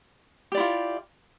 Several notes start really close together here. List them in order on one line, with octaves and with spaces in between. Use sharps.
G4 D5 E4 F4